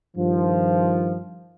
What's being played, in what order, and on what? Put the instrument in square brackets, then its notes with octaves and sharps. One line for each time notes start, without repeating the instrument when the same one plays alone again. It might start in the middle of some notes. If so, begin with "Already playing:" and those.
[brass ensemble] G2 D#3 F3